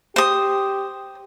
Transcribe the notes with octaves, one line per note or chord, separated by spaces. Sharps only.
G4 C5 D#6